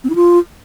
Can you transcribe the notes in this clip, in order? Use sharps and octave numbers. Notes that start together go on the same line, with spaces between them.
C4
E4
F4